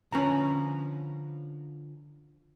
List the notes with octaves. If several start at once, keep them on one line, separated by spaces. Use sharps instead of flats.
D3 F3 C#4 B4 A#5